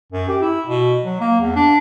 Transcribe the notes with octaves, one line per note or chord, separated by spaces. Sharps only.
F#2
G4
E4
B2
F#3
A#3
E2
D4